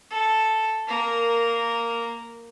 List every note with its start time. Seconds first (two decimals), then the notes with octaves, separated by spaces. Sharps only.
0.10 A4
0.88 A#3 A#4